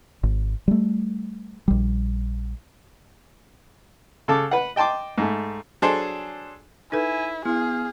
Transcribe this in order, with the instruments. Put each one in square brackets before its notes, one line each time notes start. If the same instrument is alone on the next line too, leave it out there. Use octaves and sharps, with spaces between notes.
[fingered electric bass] G#1
G3 A3
A#1 G3
[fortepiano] C#3 A4 A5 D6
B4 F#5
D#5 G5 A5 C6 D6
G#2 A3
F#3 D4 G#4 A4 C5
[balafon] D#4 A4 B4 [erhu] E4 [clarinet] G#5
[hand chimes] B3 [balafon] E4 [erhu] G#4 [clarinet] F5